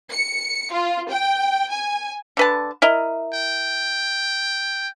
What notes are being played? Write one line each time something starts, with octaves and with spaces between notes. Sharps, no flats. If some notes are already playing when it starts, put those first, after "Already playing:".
C#7
F4
G5
G#5
D3 B4 A5
E4 A#4 D#5
G5